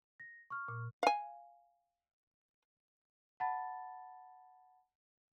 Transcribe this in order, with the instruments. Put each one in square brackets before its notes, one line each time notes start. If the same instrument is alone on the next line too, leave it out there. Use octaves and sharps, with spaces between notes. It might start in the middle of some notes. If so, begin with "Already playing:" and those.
[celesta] A#6
C#6 F6
[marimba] A#2
[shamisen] F5 G#5
[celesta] F#5 A5 B5 A6